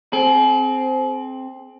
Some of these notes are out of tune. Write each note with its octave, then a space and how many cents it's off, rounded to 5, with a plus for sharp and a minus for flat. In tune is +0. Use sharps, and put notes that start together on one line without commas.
C4 +0 G#4 +45